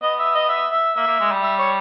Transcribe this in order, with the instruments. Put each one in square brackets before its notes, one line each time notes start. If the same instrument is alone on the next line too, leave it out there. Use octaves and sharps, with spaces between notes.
[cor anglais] B3 [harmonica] D#5
[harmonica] E5
D#5
E5
E5
[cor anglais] A#3 [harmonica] E5
[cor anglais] A#3
G#3
G3
[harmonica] E5
C#5